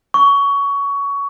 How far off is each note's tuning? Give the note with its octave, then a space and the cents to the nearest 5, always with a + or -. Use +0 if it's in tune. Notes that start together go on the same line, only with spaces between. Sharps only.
C#6 +20